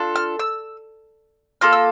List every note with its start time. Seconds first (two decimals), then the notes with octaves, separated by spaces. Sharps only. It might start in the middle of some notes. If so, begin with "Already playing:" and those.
Already playing: D4 F4 A4
0.15 F6
0.39 E6
1.61 A#3 F4 A4 F6
1.73 E6